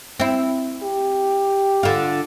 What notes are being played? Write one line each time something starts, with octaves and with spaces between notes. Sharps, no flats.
C4 E4
G4
D3 F4